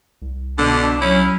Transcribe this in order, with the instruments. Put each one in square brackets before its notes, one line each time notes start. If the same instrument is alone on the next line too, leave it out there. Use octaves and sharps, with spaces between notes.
[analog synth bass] C2
[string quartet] B2 [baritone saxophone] D3 [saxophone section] D4
[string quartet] F#3 [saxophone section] C#4 [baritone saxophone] E4